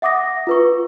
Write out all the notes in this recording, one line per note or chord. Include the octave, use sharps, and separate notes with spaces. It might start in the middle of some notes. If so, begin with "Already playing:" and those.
E5 F#5 D6 D#6 A#6
F4 B4 C#6